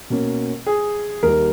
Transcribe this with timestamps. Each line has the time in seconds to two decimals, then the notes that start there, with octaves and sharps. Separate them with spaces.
0.10 B2 A#3 C#4
0.67 G#4
1.23 D#2 D#3 G3 A#4